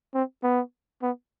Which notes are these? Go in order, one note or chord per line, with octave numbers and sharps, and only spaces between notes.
C4
B3
B3